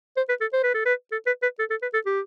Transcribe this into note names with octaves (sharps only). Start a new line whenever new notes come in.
C5
B4
A4
C5
B4
A4
B4
A4
B4
B4
A4
A4
B4
A4
G4